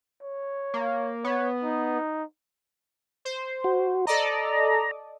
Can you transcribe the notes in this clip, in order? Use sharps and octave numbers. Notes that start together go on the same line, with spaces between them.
C#5
A#3
B3 C#5
D#4
C5
F#4
A4 D5 D#5 A#5